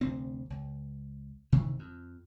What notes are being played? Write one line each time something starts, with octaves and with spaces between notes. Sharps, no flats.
F1 D2 C4
C#2
G1 C3 D#3 E3
F2